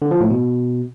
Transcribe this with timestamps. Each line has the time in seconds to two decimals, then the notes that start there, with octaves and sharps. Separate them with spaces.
0.02 D3
0.11 F3
0.21 A2
0.30 B2